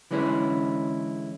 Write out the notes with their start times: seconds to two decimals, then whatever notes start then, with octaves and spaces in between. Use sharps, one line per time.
0.11 D3 E3 G#3 C#4 E4